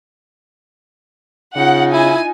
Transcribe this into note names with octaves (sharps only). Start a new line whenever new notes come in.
C#3 D#4 F4 F#5
E4 G#5